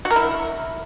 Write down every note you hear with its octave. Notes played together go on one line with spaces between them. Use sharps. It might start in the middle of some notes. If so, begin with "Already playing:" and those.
F#4
A#4
E4